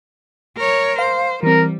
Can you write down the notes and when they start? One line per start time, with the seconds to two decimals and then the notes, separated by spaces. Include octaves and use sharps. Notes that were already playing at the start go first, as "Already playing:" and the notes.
0.57 A#4 C#5
0.99 C5 F5
1.43 E3 G3 C4 A#4